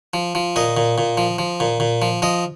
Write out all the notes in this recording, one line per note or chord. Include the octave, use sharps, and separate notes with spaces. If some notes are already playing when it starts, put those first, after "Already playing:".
F3
F3
A#2 D#5
A#2
A#2
F3
F3
A#2
A#2
F3
F3 D#5